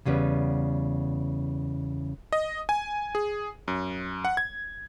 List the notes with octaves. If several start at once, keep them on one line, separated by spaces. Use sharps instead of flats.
E2 C#3 G3 B3
D#5
G#5
G#4
F#2
F#5
G#6